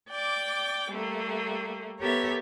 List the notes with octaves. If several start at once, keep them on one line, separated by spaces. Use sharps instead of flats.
D5 G5 D6
G3 A3 A#3
B3 G4 A4 A#4 C#5 E5